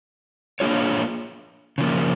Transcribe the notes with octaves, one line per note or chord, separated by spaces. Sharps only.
A#3 D4 F4 G#4 C#5
C#3 F3 A#3